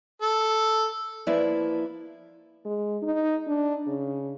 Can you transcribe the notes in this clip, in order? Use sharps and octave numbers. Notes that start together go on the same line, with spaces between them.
A4
F3 A#3 E4 B4 D5 E5
G#3
D#4
D4
C#3